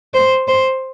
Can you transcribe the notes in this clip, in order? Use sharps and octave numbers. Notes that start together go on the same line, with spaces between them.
C5
C5